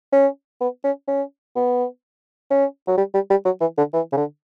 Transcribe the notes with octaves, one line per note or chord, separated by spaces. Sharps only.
C#4
B3
C#4
C#4
B3
C#4
F#3
G3
G3
G3
F#3
E3
D3
E3
C#3
D3